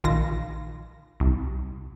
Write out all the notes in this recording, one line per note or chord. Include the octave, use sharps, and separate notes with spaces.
A#1 D#3 F4 A#6
C2